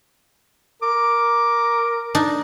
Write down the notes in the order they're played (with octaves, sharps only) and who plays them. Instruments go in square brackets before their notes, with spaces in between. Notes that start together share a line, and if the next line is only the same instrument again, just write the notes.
[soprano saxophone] A#4 [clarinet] D6
[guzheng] D4 D#4